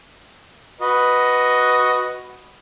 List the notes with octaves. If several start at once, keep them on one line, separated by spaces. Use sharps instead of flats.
F#4 B4 D#5